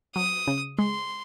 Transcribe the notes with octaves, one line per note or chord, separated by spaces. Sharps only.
F#3 D#6
C#3
G#3 C6